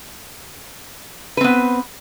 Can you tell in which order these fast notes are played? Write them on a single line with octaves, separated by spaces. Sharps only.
B4 C4 B3